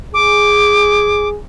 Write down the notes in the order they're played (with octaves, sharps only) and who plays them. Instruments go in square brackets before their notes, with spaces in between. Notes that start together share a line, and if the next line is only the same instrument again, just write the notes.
[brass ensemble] G#4 [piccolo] D6